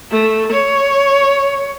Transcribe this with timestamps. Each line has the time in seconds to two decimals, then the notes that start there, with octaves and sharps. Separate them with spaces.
0.11 A3
0.52 C#5